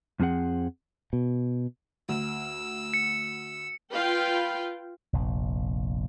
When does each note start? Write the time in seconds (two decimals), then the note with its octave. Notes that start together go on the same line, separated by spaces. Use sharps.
0.20 F2 F3 C4 G#4 F#5
1.13 B2
2.09 D2 E6
2.94 C#7
3.94 F4 B4 F5 G5
5.13 F1 A#1